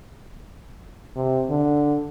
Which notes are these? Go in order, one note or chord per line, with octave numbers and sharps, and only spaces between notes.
C3
D3